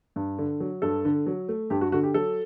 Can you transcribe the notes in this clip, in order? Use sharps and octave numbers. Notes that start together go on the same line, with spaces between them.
G2
D3
F#3
G2 A4
D3
F#3
A3
G2 G4
F#4
D3 F#4
G4
F#3 A4